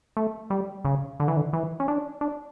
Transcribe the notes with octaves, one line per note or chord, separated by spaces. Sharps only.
A3
G3
C#3
D3
E3
D3
E3
C#4
D4
D4